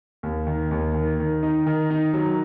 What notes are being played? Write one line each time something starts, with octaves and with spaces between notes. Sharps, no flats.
D#2
D#3
D#2
D#3
D#3
D#4
D#3
D#4
F#3